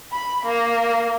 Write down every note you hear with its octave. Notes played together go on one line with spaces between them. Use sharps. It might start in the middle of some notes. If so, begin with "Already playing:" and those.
B5
A#3